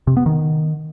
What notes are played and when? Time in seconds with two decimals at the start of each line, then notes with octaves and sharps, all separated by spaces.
0.07 C3
0.17 B3
0.26 D#3